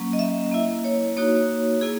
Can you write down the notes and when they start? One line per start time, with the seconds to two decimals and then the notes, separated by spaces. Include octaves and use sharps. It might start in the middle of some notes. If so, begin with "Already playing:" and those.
Already playing: F#3 A#3 C#4
0.13 D#5
0.19 E5
0.52 A#3 E4
0.84 C#5
1.17 A#3 D#4 F#4 C#5
1.81 A#3 E4 G#4